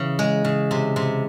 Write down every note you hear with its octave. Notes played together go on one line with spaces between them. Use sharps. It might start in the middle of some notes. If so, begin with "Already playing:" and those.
Already playing: C#3 E3
G#3
C#3
C3
C3